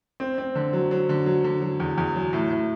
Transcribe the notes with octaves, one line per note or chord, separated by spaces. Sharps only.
C4
C4
D3
F#3
F#3
D3
F#3
D3
F#3
E2
E2
F#3
A2
A2